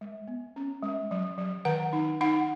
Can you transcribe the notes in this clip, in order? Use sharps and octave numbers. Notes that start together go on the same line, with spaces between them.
G#3
B3
C#4
G#3
F#3
F#3
D#3 F#5
D#4
D#4 F#5